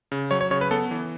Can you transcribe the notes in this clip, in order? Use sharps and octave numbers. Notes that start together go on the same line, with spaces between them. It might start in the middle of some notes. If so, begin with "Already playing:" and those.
C#3
F#3 C#5
C#5
C#3 C#5
B4
B3 A4
E3